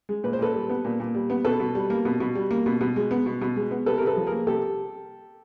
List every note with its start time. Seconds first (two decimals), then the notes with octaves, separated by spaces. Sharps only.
0.09 G#3
0.24 A#2 B4
0.33 C5
0.39 A#2 A4 B4
0.54 G3
0.69 B3
0.85 A#2
1.00 A#2
1.15 G3
1.30 B3
1.45 B2 A4 B4
1.60 B2
1.75 G3
1.90 A#3
2.05 B2
2.20 B2
2.35 G3
2.51 A#3
2.66 B2
2.81 B2
2.96 G#3
3.11 B3
3.26 B2
3.42 B2
3.56 G#3
3.71 B3
3.86 C3 A4 B4
3.98 A#4
4.02 C3
4.07 A4 B4
4.17 F3
4.27 G#4 A#4
4.32 A#3
4.47 C3 G4 A4